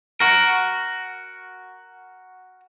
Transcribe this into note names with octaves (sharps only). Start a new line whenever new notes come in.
F#4 A#4